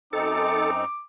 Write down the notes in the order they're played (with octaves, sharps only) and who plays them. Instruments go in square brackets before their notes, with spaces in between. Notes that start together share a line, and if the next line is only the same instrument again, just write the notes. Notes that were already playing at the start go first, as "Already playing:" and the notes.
[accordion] F#2 C4 D#4 [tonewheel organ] A4 [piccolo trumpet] D6